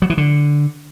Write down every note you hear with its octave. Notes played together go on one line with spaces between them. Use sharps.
F#3
E3
D3